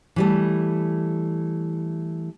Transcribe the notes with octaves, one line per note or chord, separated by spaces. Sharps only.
E3 G3 A3